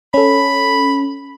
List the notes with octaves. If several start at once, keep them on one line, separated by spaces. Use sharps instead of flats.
C#4 A4 B5